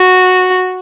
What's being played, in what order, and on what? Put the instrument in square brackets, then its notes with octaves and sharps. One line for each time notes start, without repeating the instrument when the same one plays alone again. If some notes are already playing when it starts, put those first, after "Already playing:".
Already playing: [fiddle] F#4